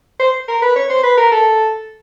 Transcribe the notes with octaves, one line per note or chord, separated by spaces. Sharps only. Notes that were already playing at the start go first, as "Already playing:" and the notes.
C5
A#4
B4
C#5
C5
B4
A#4
A4